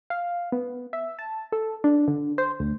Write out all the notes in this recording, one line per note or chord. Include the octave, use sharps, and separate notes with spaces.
F5
B3
E5
A5
A4
D4
D3
C5
D2